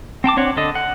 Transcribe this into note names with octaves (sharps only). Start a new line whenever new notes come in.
C4 G5 A5 D6
C4 D4 C#5 F#5
D3 A4 D#5
F#5